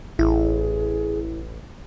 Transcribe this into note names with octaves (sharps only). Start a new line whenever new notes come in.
A1 E4 G#4